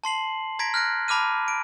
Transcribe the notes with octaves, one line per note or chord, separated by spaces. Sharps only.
A5 C6 C7 F#7
A#5 G#6 A#6 B6 D7
F6 F#6 A#6 D7
A5 B5 D6 F6 D#7
D7